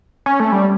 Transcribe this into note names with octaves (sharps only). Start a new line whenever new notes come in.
C#4
A3
G3